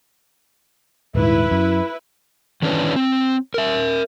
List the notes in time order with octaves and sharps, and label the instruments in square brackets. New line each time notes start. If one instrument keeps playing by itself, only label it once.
[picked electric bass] D#1 G#2 [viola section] E4 B4
[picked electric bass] F#2
[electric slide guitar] D#3 E3 C#4 D4 B4
C4
A#4 E5